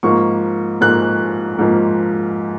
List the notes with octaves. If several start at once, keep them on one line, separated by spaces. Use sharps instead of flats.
G#2 F3 A#3 C#6
G#2 F3 A#3 F#6
G#2 F3 A#3